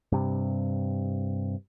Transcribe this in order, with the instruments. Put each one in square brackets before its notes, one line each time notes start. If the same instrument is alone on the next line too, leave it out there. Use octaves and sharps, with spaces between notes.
[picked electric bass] G2 C3